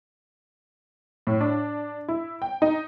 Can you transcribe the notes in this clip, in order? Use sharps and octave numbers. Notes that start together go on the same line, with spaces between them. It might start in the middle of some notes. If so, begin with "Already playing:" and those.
A2
D4
E4
G5
D#4